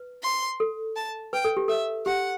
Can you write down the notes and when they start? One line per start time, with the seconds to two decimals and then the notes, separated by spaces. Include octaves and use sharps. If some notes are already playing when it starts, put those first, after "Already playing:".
Already playing: B4
0.23 C6
0.60 A4
0.96 A5
1.33 B4 G5
1.45 A4
1.57 G4
1.68 A4 E5
2.06 G4 F#5